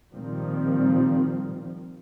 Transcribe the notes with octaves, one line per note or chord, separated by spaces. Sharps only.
A#2 D#3 F3 G3 C4